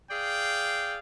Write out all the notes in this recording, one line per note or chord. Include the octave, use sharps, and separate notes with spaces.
G#4 D5 F5 G5